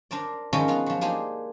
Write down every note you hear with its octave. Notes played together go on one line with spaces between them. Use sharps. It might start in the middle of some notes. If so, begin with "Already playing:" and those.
D4 A#4 C5 D5
D#3 F3 G#3 C#4 E4 A#4
B3 F4 F5
F3 F#3
A#3 D4 D#4 G4 G#4 C5